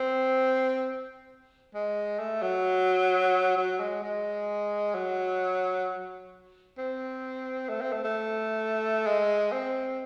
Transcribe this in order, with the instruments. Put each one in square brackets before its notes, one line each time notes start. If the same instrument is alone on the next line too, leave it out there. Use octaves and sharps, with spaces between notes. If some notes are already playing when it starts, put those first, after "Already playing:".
Already playing: [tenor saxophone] C4
G#3
A3
F#3
F#3
G#3
G#3
F#3
C4
A3
C4
A3
A3
G#3
C4